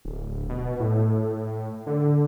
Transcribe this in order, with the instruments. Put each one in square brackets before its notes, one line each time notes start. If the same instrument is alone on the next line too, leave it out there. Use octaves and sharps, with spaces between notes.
[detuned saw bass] D1
B2
A2
D3